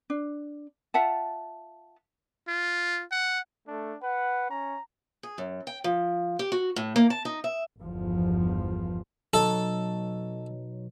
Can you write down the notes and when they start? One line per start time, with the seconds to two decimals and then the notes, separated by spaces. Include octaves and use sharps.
0.10 D4
0.94 F4 E5 F#5 A5
2.48 F4
3.12 F#5
3.68 A3 D4
4.03 B4 F#5
4.50 C#4 A#5
5.23 G#4
5.38 F#2
5.67 G5
5.84 F3
6.39 G4
6.52 F#4
6.76 A2
6.96 A#3
7.10 A5
7.25 D#4
7.44 E5
7.81 G1 E2 F3
9.34 B1 F#3 D#4 A4